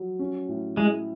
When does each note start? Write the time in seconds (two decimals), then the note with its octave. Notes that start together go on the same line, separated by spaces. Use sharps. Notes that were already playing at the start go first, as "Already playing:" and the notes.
Already playing: F#3
0.19 C#4
0.48 A2
0.77 G#3 E4